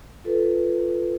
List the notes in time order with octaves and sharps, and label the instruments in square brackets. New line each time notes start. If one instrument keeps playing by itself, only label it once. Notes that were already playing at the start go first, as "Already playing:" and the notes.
[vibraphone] F4 A4 B4